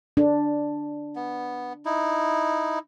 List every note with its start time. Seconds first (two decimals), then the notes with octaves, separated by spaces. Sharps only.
0.17 D4
1.16 B3
1.85 D#4 E4